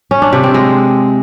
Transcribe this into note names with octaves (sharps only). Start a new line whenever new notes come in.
C#4
D4
C3
C4
G#3